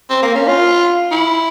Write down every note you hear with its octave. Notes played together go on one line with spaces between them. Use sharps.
C4
A#3
C#4
F4
E4